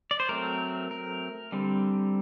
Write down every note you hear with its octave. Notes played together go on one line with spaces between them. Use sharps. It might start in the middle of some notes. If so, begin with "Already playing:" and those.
D5
C5
F#3 A3 C4 A#4
A#4
D3 G3 C4